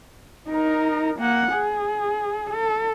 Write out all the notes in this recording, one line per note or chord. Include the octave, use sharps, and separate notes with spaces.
D#4 A#4
A#3 F#5
G#4
A4